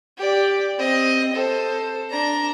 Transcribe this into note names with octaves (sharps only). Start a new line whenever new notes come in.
G4 D5
C4 D#5
A4 C5
D4 A#5